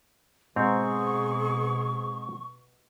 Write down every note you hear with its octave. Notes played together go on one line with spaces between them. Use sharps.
G#2 B2 C4 G#4 A#5 C#6